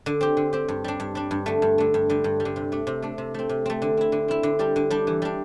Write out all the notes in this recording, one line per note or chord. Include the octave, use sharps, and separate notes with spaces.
D3
C4 G4
D3
C4 G4
G2
G3 D4
G2
G3 D4
G2
D3 A3
G2
D3 A3
G2
D3 G3
G2
G3
D3
C3
A3 D4
C3
A3 D4
C3
A3 C4
C3
A3 C4
D3
C4 E4
D3
C4 E4
D3
G3 D4 G4
D3
G3 D4 G4
E3
G3 D4